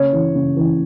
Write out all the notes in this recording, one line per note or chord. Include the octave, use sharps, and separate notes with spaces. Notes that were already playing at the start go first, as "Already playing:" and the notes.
Already playing: C#3 C#5
E3
C#3
E3